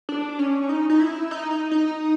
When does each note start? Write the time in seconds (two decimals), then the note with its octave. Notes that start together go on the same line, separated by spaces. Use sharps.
0.09 D4
0.39 C#4
0.69 D#4
0.90 D#4
1.00 E4
1.31 D#4
1.51 D#4
1.71 D#4